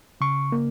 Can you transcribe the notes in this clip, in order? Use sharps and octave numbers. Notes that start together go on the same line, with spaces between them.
C#3 C#6
A#3